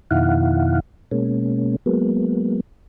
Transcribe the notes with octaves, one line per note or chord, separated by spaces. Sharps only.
F2 B2 D#3 E4 F5 F#5
B2 G#3 A#3 C#4
F#3 G#3 A#3 B3